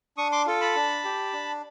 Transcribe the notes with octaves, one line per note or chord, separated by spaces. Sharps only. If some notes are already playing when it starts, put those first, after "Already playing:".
D4 C#6 D#6
C6 D6
F4 A4
A5 B5
D4
G4
D4